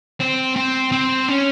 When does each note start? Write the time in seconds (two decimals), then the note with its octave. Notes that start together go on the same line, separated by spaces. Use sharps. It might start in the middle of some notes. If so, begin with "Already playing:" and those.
0.21 C4
0.56 C4
0.92 C4
1.28 C#4